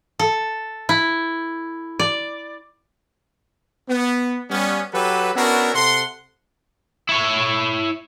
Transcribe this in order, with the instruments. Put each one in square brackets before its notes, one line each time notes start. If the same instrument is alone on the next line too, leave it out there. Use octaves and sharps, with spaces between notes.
[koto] A4
E4
D5
[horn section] B3
G3 B3 C#4
F#3 G4 A4 B4
B3 C#4 D4 E4 F#4 A#4
C3 A4 F#5 C6
[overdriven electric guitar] E4 C#5